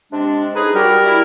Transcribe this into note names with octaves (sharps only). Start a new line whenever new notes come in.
C3 G#3 D4
A2 D#4 G#4 B4
G3 F#4 G4 A#4
E4